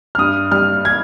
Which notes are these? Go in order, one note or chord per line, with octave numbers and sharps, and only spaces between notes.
F6
G2 D#6
G3 F6
G#6